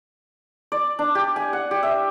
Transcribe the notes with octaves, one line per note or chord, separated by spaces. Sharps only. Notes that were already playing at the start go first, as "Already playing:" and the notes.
D5
D4
G4
G#5
F#5
G4
E5